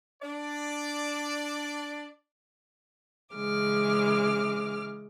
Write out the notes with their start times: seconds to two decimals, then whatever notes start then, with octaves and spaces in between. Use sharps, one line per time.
0.23 D4 D5
3.34 C#3 E3 G#3 D6 F6